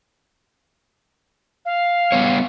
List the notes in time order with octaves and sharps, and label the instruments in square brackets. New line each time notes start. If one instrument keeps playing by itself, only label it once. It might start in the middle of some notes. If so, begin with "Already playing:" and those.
[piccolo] F5
[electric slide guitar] G3 B3 C#5